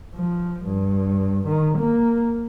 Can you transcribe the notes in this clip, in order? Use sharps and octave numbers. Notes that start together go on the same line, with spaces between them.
F3
G2
D#3
A#3